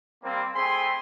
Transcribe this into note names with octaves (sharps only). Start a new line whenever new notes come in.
G3 A#3 C4
A3 C4 G#4 G#5 B5 C6